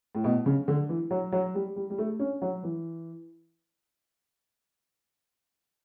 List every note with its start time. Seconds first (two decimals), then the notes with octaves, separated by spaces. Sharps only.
0.15 A2
0.24 B2
0.46 C#3
0.68 D3
0.89 E3
1.11 F#3
1.32 F#3
1.55 G3
1.76 G3
1.90 G3
1.98 A3
2.19 C#4
2.42 F#3
2.63 E3